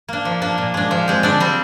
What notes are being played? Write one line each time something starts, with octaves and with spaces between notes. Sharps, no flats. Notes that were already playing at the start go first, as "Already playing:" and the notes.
A#3 D4
F3
A#3 D4
A#2
G#3 D4
F3
G#3 C4
D3 D4 D5
G3 C4